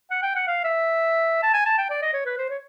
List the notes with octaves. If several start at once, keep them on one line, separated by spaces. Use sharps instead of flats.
F#5
G5
F#5
F5
E5
A5
G#5
A5
G5
D5
D#5
C#5
B4
C5
C#5